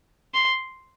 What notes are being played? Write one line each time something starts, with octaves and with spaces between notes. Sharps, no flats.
C6